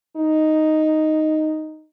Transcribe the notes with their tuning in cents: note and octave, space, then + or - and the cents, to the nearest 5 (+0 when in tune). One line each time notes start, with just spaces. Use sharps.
D#4 +0